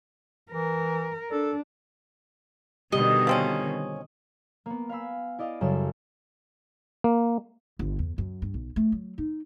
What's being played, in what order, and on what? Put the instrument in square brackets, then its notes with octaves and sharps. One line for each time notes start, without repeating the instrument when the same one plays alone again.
[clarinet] E3 [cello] A#4
[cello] D4 [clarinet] A4
[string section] B2 D3 D#3 [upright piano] G3 [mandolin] D#5
[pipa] F3 C4 C#4
[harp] A#3 B3
F5 G#5 B5 E6
E4 D5 D#5 F5
F#2 C#3 G3 A4 E7
[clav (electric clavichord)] A#3
[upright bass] G1
E2
F#2
G2
B1
A3
F#3
D#4